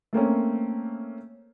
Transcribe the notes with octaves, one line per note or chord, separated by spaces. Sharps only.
A3 A#3 C4 C#4